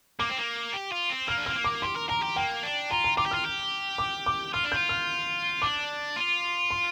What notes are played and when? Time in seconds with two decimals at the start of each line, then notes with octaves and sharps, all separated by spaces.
0.20 A#3 D6
0.29 C4
0.38 A#3
0.73 G4
0.92 F4
1.10 C4
1.27 A#3 F6
1.38 D4
1.46 C4 F6
1.55 A#3
1.64 D6
1.82 G4 C6
1.96 A#4
2.09 A#4 A#5
2.22 G4
2.36 A#3 G5
2.63 D4
2.90 F4 A#5
3.04 A#5
3.17 F4 D6
3.26 G4
3.31 F4 F6
3.45 G4
3.98 D6
4.26 D6
4.54 F4 F6
4.64 D4
4.72 F4 G6
4.89 F6
5.62 D4 D6
6.16 F4
6.70 C6